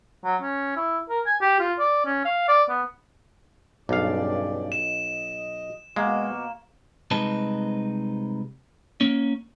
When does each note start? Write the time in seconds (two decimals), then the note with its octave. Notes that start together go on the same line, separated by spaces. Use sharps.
0.24 F#3
0.42 C#4
0.77 E4
1.10 A#4
1.26 G#5
1.41 G4
1.60 F4
1.79 D5
2.06 C#4
2.25 F5
2.48 D5
2.70 B3
3.89 B1 G2 C#3 D5 F5
4.72 D#5 E7
5.96 B2 G#3 A#3 F#4
7.11 C2 C3 G#3 D#4 B4 A5
9.01 A#3 C#4